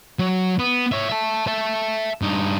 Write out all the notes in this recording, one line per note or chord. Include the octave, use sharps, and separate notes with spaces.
F#3
B3
C#5 E5
E5 A5
E5 A5
G2 D#4